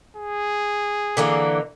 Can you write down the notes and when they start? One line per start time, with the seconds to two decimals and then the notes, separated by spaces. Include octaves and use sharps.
0.16 G#4
1.17 D3 E3 A#3